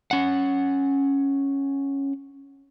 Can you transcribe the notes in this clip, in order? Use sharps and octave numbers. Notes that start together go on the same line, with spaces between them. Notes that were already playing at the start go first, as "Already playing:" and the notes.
C#4 F#5